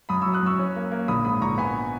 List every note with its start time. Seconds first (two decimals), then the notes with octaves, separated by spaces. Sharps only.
0.09 F#2 B5 D#6
0.22 F#3 C#6 E6
0.33 D#6 F#6
0.43 F#2 C#6 E6
0.59 C#4
0.76 A#3
0.92 A#3
1.08 A#1 B5 D#6
1.25 G#2 B5 D#6
1.41 A#1 A#5 C#6
1.58 B3 G#5 B5